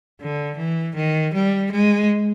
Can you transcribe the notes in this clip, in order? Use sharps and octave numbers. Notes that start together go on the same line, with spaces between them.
D3
E3
D#3
G3
G#3